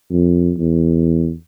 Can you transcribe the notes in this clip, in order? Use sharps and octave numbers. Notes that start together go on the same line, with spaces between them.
F2
E2